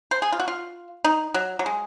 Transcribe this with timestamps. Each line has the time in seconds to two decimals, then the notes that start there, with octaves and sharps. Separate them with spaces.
0.11 C5
0.22 G#4
0.32 F4
0.40 F#4
0.48 F4
1.04 D#4
1.34 F#3
1.59 F#3
1.66 G#3